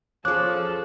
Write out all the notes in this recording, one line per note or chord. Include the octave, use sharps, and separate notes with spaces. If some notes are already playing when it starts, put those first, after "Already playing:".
F3 C#4 G#4 A4 D6 F#6